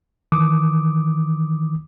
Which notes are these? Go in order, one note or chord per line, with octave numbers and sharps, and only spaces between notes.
D#3 E3 D6 D#6